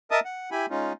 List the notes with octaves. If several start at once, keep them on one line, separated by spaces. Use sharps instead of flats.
A#4 D#5 E5 A5 D#6
F#5
E4 G4 G#5 B5
G#3 C#4 D#4 F4